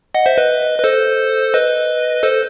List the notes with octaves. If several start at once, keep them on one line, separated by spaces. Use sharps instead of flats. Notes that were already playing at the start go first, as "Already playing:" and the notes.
D#5 F#5
C5 E5
B4 D#5
B4
A4 C5
B4 D#5
A4 C5